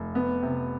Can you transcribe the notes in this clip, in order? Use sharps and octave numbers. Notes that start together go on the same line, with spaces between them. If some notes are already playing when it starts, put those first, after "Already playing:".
Already playing: F1
B3
C3